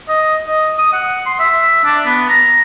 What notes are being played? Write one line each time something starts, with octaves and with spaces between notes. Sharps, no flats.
D#5
D#5
D#6
F#5
C6
E5
D4
B3
A#5